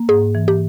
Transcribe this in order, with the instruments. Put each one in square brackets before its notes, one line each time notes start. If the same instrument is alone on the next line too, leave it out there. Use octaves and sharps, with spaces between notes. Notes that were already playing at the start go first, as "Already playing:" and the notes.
Already playing: [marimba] A#3
[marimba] G#2 [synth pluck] G#4
[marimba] E3
[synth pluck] G4